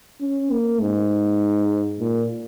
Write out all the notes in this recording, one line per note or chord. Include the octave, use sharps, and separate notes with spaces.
C#4
A#3
G#2
A#2